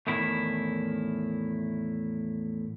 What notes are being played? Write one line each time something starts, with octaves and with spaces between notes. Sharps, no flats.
E2 A2 D#3 E4